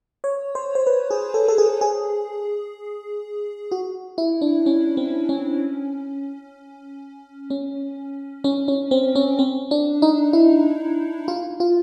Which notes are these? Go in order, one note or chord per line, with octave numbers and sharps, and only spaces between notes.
C#5
C5
C5
B4
G#4
A4
A4
G#4
G#4
F#4
E4
D4
C#4
C4
C#4
C#4
C#4
C#4
C4
C#4
C4
D4
D#4
E4
F4
F4